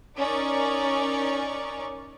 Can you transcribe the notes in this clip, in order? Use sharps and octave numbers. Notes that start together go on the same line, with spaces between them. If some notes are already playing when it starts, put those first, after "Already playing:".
C#4 D#4 A#4 D5 C#6